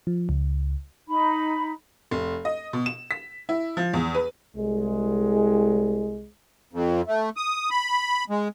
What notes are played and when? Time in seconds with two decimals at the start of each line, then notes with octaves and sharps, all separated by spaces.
0.07 F3
0.29 C#2
1.09 D#4 B5
2.11 F1
2.45 D#5
2.73 B2
2.86 E7
3.11 B6
3.49 E4
3.77 F3
3.93 E2
4.15 B4
4.56 C2 G#3
6.73 F2
7.07 A3
7.37 D#6
7.70 B5
8.30 G#3